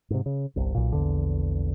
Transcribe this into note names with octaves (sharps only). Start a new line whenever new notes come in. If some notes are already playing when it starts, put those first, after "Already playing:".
G#2 C3
C#3
G1 C2 C3
B1 A#2
A#1 E2 D3